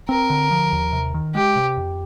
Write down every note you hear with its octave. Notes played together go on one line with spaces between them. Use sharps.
C4 A#4
D3
F3
D#2
C3
D#3
G#3 G4
C3
F2